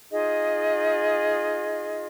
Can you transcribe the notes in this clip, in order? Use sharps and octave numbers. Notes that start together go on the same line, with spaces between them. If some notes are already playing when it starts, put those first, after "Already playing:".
D#4 F4 G#4 D#5